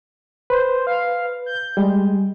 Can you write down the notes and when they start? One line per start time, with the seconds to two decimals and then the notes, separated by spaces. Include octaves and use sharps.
0.50 B4 C5
0.87 F5
1.46 G6
1.77 G3 G#3